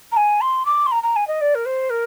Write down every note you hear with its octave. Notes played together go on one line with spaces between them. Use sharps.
A#5
G#5
C6
D6
C6
A#5
A#5
G#5
D#5
D5
A#4
C5
A#4